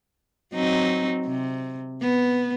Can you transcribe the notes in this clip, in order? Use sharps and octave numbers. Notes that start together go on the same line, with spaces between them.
F#3 C4 D#4
C3
B3